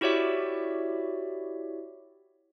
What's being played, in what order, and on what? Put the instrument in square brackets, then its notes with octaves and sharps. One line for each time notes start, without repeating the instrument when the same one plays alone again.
[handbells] E4 F#4 G4 C#5 D5 E5